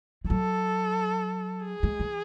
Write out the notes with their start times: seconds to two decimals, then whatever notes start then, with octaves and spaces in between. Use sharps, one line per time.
0.25 G#3
0.30 F#3 A4
1.66 G#4
1.83 G#3
2.00 E3